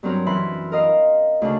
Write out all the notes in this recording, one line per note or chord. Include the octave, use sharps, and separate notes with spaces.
G2 F#3 C4 A#4 C#5
F#2 E3 B5 C6
A#4 D#5 F5
D2 C#3 D4